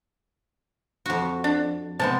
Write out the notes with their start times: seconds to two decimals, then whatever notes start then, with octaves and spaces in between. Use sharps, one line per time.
1.06 F2 F#4
1.44 D4
2.00 C3 G#3 B3 A5